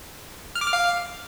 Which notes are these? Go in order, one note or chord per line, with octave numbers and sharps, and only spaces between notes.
F6
D6
F6
F5